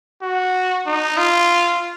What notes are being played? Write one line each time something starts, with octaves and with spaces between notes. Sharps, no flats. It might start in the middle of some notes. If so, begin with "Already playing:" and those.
F#4
D#4
F4